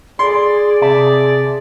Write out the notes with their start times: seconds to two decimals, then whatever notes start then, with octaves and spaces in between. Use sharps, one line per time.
0.19 G#4 D5 C6
0.82 C3 D5 E5 A5